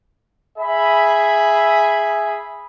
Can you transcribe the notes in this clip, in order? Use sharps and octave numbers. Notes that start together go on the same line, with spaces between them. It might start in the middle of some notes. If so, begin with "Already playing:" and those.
G#4 E5 B5